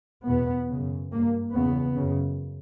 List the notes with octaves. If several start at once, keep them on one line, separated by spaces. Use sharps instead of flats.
E2 B2 B3
F#2 C#3
G2 A#3
E2 C#3 B3
F#2 C#3